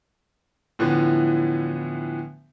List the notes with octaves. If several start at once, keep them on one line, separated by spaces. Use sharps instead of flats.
A2 D3 E3 F3 B3